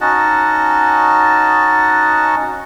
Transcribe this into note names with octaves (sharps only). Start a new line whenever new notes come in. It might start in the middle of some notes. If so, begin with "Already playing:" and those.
C#4 D#4 F#4 D#5 F#5 A5